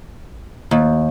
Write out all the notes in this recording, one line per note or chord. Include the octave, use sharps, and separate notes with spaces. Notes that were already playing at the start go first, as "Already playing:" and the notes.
D#2